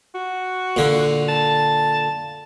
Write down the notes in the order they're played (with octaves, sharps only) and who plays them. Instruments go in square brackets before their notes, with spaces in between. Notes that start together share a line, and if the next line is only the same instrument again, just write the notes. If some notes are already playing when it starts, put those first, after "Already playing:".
[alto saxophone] F#4
[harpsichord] A#2 D3
[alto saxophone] A5